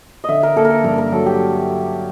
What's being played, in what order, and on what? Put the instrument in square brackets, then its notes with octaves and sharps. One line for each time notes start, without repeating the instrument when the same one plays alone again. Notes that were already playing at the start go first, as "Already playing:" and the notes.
[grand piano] D3 [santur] D#5 E5
[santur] A#4
[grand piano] A#3 [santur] A4
[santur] A#4
A4
[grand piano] G2 [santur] A#4
[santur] A#4
[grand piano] F#3 [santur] A4
[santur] G4